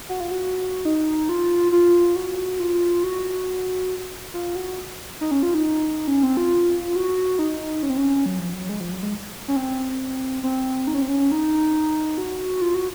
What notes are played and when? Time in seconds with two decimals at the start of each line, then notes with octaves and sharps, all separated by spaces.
0.09 F#4
0.20 F4
0.31 F#4
0.85 D#4
1.29 F4
1.72 F4
2.16 F#4
2.60 F4
3.03 F#4
4.34 F4
4.55 F#4
5.21 D#4
5.31 C#4
5.43 F4
5.54 D#4
6.08 C#4
6.23 C4
6.37 F4
6.96 F#4
7.39 D#4
7.83 C#4
7.90 C4
7.97 C#4
8.26 F#3
8.39 F3
8.53 F#3
8.69 G#3
8.80 F3
8.91 F#3
9.03 G#3
9.48 C#4
9.56 C4
10.43 C4
10.87 D#4
10.94 C#4
11.02 C4
11.09 C#4
11.32 D#4
12.18 F#4
12.61 F4
12.74 F#4